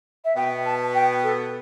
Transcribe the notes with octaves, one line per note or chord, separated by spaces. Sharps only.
E5
B2 B3 G5
A5
G5
A4